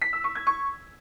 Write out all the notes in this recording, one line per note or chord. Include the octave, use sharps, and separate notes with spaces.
B6
E6
C#6
G#6
C#6